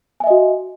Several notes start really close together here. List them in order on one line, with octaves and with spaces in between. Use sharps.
G#5 E5 D#5 F#4